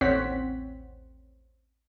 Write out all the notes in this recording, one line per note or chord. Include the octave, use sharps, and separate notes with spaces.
A1 D#2 C4 C#5 F#5 B6